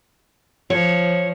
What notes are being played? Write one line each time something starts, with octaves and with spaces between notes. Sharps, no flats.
F3 C#5